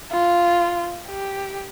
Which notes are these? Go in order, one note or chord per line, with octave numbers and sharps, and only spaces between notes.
F4
G4